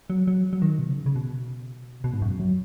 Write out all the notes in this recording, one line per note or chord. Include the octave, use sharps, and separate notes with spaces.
F#3
F#3
F#3
D#3
B2
C#3
C#3
B2
B2
G#2
F#2
F#3